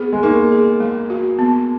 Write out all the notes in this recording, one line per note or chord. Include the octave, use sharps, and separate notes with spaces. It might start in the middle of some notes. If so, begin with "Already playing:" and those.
Already playing: B3 G#4
G#3
A#3 D#4
G#4
G#3
F#4
B3